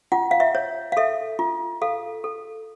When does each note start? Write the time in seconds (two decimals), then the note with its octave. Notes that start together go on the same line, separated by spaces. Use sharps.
0.12 F4 F#5
0.31 F5
0.40 E5
0.55 C#5
0.92 F5
0.97 A4 E5
1.39 F4
1.82 A4 F5
2.24 A4